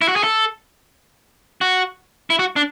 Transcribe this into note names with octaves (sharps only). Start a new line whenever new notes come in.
E4
F#4
G#4
A4
F#4
E4
F#4
D4